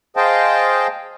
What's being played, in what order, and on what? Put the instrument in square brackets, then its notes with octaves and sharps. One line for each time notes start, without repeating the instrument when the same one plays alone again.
[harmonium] G#4 C5 D#5 F5 G5 A5